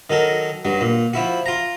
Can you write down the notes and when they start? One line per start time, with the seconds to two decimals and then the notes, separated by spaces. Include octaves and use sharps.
0.10 D#3 F#3 A4 A#4
0.65 G2 F#3
0.81 A#2
1.13 F3 E4 F#4
1.46 F4 A#5